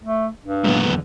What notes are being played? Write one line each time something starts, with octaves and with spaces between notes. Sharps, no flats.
A3
G2
F#2 A#2 G#3 B3
E2 D3